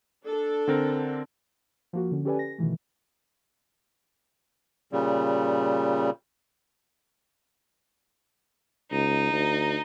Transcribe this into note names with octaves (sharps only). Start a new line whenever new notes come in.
D4 A4
D3 C4 A#4
F3 A#3 F#4
D3 C#4
C#4 G4 A4 B4 D5 G#5
A#6
B2 D#3 E3 A3
A#2 C#3 G3
C#2 D#4
D2